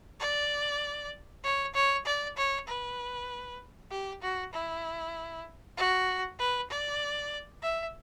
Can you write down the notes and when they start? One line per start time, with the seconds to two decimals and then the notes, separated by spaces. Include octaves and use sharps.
0.20 D5
1.44 C#5
1.74 C#5
2.06 D5
2.37 C#5
2.67 B4
3.91 G4
4.22 F#4
4.53 E4
5.77 F#4
6.39 B4
6.70 D5
7.62 E5